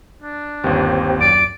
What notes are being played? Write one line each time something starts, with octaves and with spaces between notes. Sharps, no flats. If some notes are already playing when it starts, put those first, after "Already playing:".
D4
G1 D#2 C4 G4
F#2 D5 D7